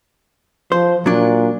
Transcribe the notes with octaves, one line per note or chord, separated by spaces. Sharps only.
F3 C5
A#2 F#3 D4